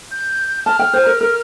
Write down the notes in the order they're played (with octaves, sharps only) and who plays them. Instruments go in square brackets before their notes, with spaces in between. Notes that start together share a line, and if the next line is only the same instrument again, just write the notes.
[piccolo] G6
[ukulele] A5 [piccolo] F6
[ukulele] G5
C5
A#4
A#4